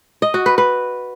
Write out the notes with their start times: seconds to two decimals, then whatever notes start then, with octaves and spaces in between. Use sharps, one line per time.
0.22 D#5
0.34 F#4
0.46 B4
0.58 B4